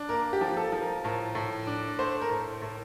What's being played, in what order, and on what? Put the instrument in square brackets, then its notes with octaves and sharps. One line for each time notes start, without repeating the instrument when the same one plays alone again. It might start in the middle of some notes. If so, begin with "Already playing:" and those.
Already playing: [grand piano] D4
[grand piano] A#3 [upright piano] A#4
[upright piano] G4
[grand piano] F3
[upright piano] A4
[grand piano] F3
[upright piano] A#4
[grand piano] A2 [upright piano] A#4
[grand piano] A2
D4
[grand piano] A3 [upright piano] C5
[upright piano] A#4
[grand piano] A2
A2